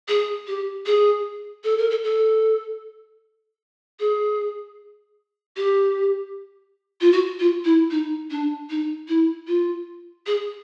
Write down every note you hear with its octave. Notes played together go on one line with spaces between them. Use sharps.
G#4
G4
G#4
A4
A#4
A4
A4
G#4
G4
F4
F#4
F4
E4
D#4
D4
D#4
E4
F4
G#4